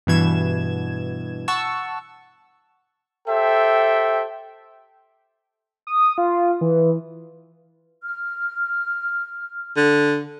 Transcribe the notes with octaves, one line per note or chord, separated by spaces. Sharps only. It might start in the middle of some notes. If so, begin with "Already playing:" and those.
G2 B2 E3 G#6 E7
F#5 A5 C#6 E6
G4 A4 C5 E5 G5
D#6
F4
E3
F6
D3